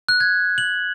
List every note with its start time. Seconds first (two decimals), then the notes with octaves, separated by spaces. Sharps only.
0.09 F#6
0.20 G#6
0.58 F#7